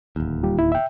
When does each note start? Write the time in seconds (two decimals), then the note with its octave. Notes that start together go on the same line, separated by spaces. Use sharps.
0.16 D1 D#2
0.43 G3 F4 G4
0.59 E4
0.72 E5 G5